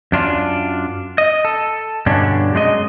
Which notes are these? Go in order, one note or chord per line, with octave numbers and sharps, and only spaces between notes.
F#2 D4 F4
D#5
A4
G2 B2 D3 C#4 D4
F#2 G#3 F#4 D#5